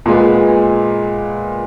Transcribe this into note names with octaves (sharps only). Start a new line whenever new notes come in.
A#2 G#3 B3